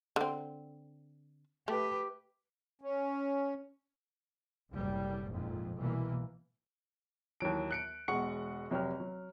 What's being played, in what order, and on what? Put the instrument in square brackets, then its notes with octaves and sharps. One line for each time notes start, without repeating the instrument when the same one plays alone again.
[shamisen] D3 C4
[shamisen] A3 [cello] G4 B4
[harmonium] C#4
[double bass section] F#1 C2 A2 G3
A#1 F2 G#2
C2 B2 E3 A#3
[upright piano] D#2 E3 F#3 D7
F#6 C#7 D7
E1 G#3 F#5 C#6 C#7
F1 F#3 G4 F6
F#3